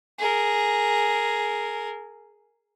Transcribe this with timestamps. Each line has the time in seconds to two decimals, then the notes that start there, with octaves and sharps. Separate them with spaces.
0.19 G#4 A#4